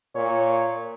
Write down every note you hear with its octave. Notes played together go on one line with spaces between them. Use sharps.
A#2 C#5